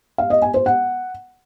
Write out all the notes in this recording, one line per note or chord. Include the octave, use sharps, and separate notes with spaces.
F5
D#5
G#5
C5
F#5